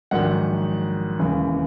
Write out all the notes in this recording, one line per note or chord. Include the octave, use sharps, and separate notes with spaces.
A#1 G#2 D#3 F#3 F#5
E1 D#2 C#3 E3